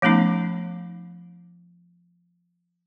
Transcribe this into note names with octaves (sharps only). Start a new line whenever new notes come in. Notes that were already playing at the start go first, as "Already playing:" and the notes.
F3 A3 B3 C#4 D#4